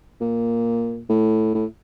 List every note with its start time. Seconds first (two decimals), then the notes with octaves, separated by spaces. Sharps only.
0.21 A#2
1.09 A2
1.54 A2